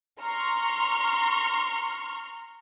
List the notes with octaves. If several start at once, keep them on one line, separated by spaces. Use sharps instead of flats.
A#5 C6 C#6 F6